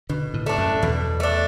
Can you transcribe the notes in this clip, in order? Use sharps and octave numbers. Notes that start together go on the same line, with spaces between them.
B2 D3
A2
A3 D4
F#2
E2 B2
A3 D4